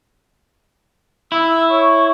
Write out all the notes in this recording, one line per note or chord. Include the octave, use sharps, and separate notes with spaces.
E4 E6
C#5 C#6